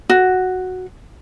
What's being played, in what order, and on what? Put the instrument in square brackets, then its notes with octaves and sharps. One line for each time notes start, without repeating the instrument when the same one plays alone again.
[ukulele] F#4